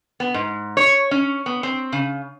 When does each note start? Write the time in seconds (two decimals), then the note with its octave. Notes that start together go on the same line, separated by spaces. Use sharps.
0.20 B3
0.34 G#2
0.77 C#5
1.11 C#4
1.46 B3
1.63 C4
1.92 C#3